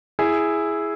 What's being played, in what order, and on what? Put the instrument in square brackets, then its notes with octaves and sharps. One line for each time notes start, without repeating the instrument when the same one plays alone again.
[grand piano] E4 G#4